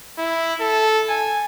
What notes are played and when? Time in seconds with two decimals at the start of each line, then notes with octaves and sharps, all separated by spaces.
0.18 E4
0.61 A4
1.09 G#5